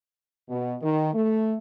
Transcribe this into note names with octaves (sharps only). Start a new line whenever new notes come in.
B2
D#3
A3